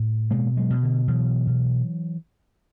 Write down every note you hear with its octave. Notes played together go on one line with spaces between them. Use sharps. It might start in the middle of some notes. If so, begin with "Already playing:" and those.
Already playing: A2
B2 G#3 A#3
F#3 G#3
B2
D3
B2 E3 F#3
B2